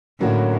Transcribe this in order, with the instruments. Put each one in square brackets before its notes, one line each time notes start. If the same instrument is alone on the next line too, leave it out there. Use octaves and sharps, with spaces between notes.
[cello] A2 [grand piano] D3 F#3 A#3 C#4 F#4